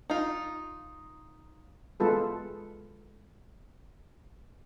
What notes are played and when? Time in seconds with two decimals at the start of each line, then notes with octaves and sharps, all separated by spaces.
0.10 D#4 F4
2.00 G#3 B3 F4 A4 B4